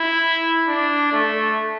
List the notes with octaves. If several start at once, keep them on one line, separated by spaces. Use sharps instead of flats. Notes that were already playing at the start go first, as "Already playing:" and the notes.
Already playing: E4
D4
A3